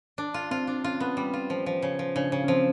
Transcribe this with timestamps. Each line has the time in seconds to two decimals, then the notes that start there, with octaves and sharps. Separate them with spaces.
0.18 D4
0.34 F4
0.51 C4 F4
0.67 D4
0.84 C#4 F4
1.00 B3
1.17 G3
1.34 F4
1.50 F3
1.66 F3
1.82 C#3
1.99 F3
2.15 C#3 D4
2.32 C#3
2.44 C#4
2.48 F3 C4